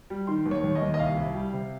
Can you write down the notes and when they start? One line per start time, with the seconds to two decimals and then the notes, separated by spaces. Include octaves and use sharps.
0.10 G3
0.27 D#3 C6
0.46 D#2
0.51 C#5
0.64 D#2
0.75 D#5
0.81 D#2
0.94 D#5
0.99 C2 F5
1.17 C2
1.35 G3
1.53 C3